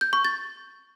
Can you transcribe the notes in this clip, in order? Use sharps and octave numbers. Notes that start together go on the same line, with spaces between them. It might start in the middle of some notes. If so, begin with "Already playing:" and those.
G6
C#6
A6